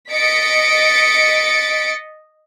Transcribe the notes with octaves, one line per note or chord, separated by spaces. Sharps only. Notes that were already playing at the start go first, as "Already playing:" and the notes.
D#5 A6 B6 C#7 D7